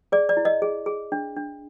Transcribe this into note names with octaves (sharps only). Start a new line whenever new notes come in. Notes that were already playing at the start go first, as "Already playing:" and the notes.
G#4 D5
D5
E4
D#5
G#4
G#4
D4
D4